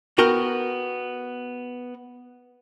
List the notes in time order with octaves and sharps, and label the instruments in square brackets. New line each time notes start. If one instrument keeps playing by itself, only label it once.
[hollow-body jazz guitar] B3 F#4 A#4 G5